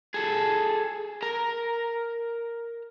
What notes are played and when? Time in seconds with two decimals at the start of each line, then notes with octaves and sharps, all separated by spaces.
0.14 G#4 A4
1.23 A#4 A#5